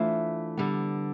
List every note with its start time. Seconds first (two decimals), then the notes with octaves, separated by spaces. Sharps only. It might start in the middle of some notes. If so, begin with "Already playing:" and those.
Already playing: E3 A3 D4 F4 C5
0.57 D3 G3 B3